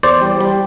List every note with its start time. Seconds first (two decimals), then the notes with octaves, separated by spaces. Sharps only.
0.03 E2 C5 D5
0.21 G3
0.40 G3